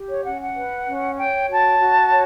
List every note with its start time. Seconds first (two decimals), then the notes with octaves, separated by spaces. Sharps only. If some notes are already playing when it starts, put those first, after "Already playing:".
Already playing: G4
0.08 C#5
0.24 C#4 F#5
0.40 F#5
0.55 B4
0.86 C#4
1.17 C#5 G5
1.48 F#4 A5
1.79 F#4
2.10 C#5